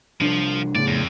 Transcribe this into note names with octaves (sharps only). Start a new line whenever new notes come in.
C2 F3 D4
A2 C#3 D5
F2